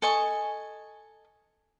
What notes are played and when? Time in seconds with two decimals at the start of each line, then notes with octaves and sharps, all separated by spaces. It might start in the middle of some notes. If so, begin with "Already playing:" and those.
0.02 A4 D#5 G#5 C#6